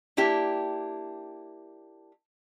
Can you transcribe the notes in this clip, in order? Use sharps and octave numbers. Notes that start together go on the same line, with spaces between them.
A#3 D4 E4 G4